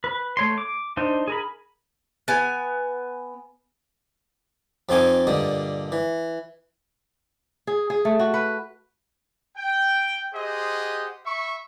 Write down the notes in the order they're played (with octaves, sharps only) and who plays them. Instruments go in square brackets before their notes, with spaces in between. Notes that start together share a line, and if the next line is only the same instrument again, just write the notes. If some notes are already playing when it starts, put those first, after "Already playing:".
[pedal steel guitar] B4
A3 C#5 C6
D6
D4 D#4 C5
G#4 A#4 B5
[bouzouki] B3 G#5
[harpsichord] F2 F3 C4 D#4 G#5 D6
G2 A#2 D3 D#5
E3
[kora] G#4
G#4
A3
F#4
B4
[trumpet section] G5
G4 G#4 C5 D#5 F#5
E5 B5 C#6